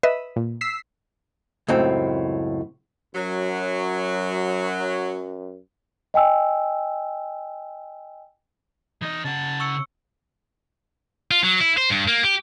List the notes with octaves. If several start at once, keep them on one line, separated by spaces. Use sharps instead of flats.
B4 D#5 E5
A#2
E6 B6 C7
C#2 F#2 A2 C4
F#2 F#3
D#5 G5 G#5 E6
E3 D#4 D#5
C#3 F#5 A5
C#6 E6 C#7
F4
F#3
E4
C5
G2
A#3
G4